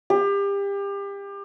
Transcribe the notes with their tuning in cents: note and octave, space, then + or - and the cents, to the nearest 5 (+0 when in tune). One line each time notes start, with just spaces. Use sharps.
G4 +30